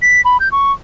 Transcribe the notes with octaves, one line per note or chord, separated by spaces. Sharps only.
B6
B5
G6
C#6